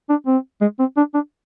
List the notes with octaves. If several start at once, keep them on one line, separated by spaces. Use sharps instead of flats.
D4
C4
G#3
C4
D4
D4